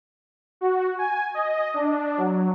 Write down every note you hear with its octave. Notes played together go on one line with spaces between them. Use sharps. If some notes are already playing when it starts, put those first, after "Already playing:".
F#4
G#5
D#5
D4
F#3